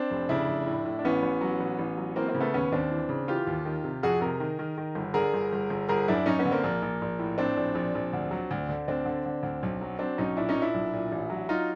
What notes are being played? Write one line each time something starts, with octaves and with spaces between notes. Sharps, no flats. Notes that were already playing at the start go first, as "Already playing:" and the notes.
Already playing: C4 D4
F1
C#3 D4 E4
F1
A2
A2
D4
A1 B3 C#4
A1
F#3
A1
A1
F#3
E3 A#3 C4
A#3 C4
C#3
A3 B3
D#2 B3 C#4
D#2 C4 D4
E3
C#3
E3 F4 G4
D#2
D#3
C3
F2 F#4 G#4
C3 G#4 A#4
D#3
D#3
D#3
G1
D3 G#4 A#4
G1
G1
G1
G1 G#4 A#4
F#2 D4 E4
F#2 C#4 D#4
B3 C#4
D3
A#3 C4
A#1 A#3
A#1
A#1
A2
A2 C4 D4
A#1
A#1
A#1
D2
F#3
D2
D3
D2 C4 D4
D3
D3
D2
B1
F#3
F#3 C4 D4
B1 C#4 D#4
A#2 D4 E4
C#4 D#4
A#2
D4 E4
B1
A#2
A1
F#3
F#3 D#4 F4